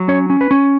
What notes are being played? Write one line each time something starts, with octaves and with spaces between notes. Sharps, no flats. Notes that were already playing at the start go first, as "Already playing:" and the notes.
Already playing: F#3
C#4 C#5
C#4
B4
C#4